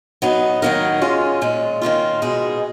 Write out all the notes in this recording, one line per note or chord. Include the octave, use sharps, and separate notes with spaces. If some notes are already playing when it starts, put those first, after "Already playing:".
F#3 B3 D#4
D#3 F#3 A#3 D#4 A#4
G#3 C#4 F4
A#2 G#3 C#4
D#3 A#3 C#4 F4
B2 G#3 D#4 G#4